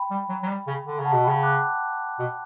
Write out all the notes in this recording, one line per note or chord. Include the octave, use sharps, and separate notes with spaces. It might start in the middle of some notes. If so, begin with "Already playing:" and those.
Already playing: G5 B5
G3
F#3
F#3
G3
C#3
D3
C#3
F#5 A5
B2
C#3 G5 B5
D6 F#6
B2